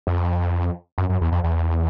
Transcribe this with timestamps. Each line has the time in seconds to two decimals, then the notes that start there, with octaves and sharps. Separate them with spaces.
0.07 F2
0.98 F#2
1.09 F#2
1.21 E2
1.32 F2
1.44 E2